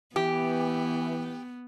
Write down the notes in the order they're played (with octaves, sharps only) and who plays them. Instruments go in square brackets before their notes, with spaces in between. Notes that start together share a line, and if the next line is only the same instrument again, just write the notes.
[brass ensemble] E3 [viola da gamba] B3 [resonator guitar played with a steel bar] G4